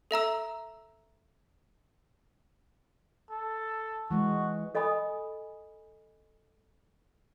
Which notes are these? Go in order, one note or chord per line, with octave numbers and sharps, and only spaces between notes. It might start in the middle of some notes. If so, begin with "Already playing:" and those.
A4 E5 A#5 E6
A4
E3 G#3 F#4
A4 D#5 G#5 B5 D#6